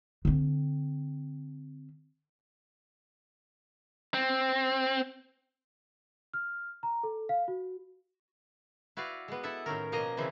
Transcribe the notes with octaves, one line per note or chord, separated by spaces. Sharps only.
D3 C4
C4
F6
A#5
A4
F5
F#4
E4 F#4 B4 D5 F5
G#3 B3
E4 A4 E5 F#5
A2 D#3 C#4 A#4
B2 F3 A#3 D#5 G#5 A#5
C#3 E3 F3 C4 E4